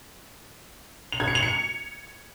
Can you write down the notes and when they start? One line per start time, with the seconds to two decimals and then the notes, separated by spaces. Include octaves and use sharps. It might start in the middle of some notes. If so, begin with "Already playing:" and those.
1.12 F7
1.20 G#6
1.28 C#7
1.35 F7
1.43 C#7